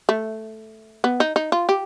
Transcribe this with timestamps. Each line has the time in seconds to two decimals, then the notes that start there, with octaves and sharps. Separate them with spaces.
0.09 A3
1.04 B3
1.20 D#4
1.36 D#4
1.52 F4
1.69 G4